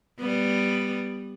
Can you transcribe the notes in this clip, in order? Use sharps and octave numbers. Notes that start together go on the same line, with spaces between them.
G3 B3